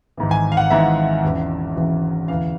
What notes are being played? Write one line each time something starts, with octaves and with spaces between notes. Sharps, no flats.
G#1 G#2 E3
G#5
F5
F#5
G#1 G#2 E3 E5
E1 E2 C#3 E3
E1 E2 C#3 E3
E1 D2 C#3 E3 F5